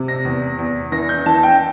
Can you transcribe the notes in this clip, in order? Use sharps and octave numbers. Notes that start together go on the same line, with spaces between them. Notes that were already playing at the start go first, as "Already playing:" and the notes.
Already playing: C3
A#6
E2
E2
E3 A#6
G6
E3 A5
G5